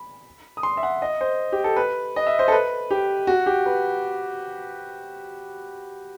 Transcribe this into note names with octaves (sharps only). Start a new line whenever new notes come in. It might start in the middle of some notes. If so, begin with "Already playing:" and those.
Already playing: B5
D#6
C6
E5
F#5
D#5
C5
G4
A4
B4
D#5
E5
C5
A4
B4
G4
F#4
G4
B4